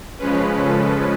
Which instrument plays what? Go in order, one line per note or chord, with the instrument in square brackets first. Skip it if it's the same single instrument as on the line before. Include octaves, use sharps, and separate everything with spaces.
[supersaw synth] C#3 F3 G#3 C#4 B4
A4